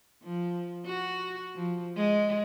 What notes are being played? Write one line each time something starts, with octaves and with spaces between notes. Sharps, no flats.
F3
F#4
F3
G#3